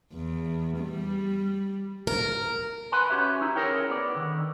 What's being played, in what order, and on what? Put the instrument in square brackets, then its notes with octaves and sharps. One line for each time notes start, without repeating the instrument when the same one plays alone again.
[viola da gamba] E2
G3
[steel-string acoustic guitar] A#4
[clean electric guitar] B4 F#5 G#5 B5 C6
C#4 F#4 G4 C#5 E5
D#4 E4
C#4 G#4 A#4 C#5 G5
B3 D5
D3 D#3